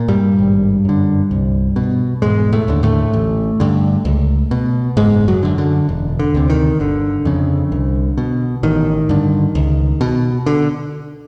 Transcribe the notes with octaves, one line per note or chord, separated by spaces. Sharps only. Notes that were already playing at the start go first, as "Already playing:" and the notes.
Already playing: A#2
G2 G3
G#1
F#2 D3
C2
B2
E1 G#2 G#3
A2 A3
D#2 D3
A2 A3
A1
G2 D3
C#2
B2
F#1 G#2 G#3
F#2 F#3
F#2 D3
D3
E1
D3
D2 C3
D#3
G1 D3
F2 C#3
C2
B2
A1 D#3
G2 D3
C#2
B2
D3